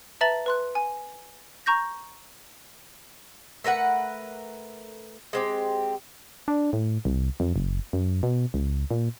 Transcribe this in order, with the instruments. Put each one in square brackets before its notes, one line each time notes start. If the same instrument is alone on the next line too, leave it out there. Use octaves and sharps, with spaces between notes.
[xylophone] B4 E5 A5 A#5 A6 F#7
B4 C6 F#6
G#5
A#5 C#6 G6 A#6
[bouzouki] A3 A#4 B4 F#5
G#3 C4 G4
[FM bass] D4
A2
C2
F2
F#1
F#2
B2
C#2
A#2